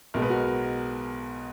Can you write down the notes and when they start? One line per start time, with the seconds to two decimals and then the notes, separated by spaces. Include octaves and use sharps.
0.14 B1 B2 G#3 A#4
0.22 B4
0.30 F#4 A#4